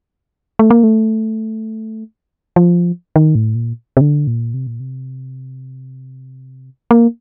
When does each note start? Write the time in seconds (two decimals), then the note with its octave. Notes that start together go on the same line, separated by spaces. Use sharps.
0.59 A3
0.70 A#3
0.84 A3
2.56 F3
3.16 D#3
3.35 A2
3.55 A#2
3.97 C3
4.01 D3
4.27 A#2
4.54 C3
4.67 A#2
4.80 C3
6.91 A#3